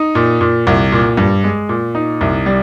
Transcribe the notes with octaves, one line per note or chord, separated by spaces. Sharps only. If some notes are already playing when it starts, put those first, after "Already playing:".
Already playing: D#4
A#2
A#2
C2
A#2
G2
G#3
A#2
D#4
C2
G3